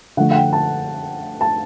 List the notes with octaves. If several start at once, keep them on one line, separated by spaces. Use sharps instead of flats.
D3 F3 A3 F#5
F#5
G5
A5
A5